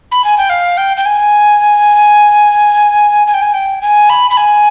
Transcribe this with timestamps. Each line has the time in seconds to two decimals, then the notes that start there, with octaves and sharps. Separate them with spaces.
0.11 B5
0.24 G#5
0.38 G5
0.50 F5
0.77 G5
0.97 G5
1.06 G#5
3.27 G#5
3.34 G5
3.42 G#5
3.54 G5
3.81 G#5
4.09 B5
4.30 B5
4.37 G#5